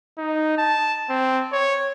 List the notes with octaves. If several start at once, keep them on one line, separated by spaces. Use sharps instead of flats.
D#4
A5
C4
C#5